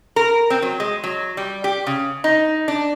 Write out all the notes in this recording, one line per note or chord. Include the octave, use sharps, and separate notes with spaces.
A#4
C4
F#3
G#3
F#3
G3
G4
C#3
D#4
D4